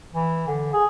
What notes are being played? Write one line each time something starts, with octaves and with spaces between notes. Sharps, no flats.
E3
D3
G#4